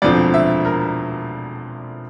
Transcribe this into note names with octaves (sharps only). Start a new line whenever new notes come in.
E1 D2 D3 F3 C4 D5
E5
A#4